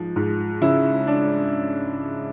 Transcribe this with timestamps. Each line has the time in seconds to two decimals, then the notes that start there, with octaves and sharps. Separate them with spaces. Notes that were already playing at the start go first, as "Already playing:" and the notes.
Already playing: G#2 F3
0.16 G#2
0.61 C#3 E4
1.07 D4